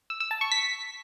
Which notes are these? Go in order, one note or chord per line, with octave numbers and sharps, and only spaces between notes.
E6
E6
A5
C#6
B6